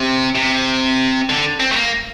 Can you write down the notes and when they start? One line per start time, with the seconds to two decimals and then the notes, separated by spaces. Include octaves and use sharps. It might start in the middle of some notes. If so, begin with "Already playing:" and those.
Already playing: C3
0.35 C3
1.29 D3
1.60 C4
1.72 A3
1.76 A#3